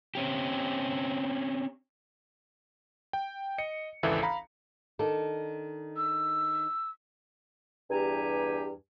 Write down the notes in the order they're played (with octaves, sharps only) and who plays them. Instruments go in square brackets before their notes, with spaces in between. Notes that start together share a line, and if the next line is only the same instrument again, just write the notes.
[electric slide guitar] C4 C#4 G4
[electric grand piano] G5
D#5 C#7
G#1 C#2 E3 A4 E5
F5 A#5 B5
[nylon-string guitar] D#3 D4 A4
[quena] E6
[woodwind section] E2 G2 G4 G#5 A#5